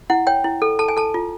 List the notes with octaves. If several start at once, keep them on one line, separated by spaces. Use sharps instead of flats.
E4 F#5
C#5 G5
E4
A4
A4 A5
G#5
A4 A5
F4